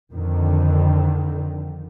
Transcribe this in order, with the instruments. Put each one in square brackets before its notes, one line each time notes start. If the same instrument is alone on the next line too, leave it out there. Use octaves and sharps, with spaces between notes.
[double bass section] F2 D3 D#3